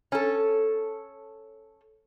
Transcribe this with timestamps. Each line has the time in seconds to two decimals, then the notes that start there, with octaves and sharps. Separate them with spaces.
0.12 C#4 A4